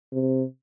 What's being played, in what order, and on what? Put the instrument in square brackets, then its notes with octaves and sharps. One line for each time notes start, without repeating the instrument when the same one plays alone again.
[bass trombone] C3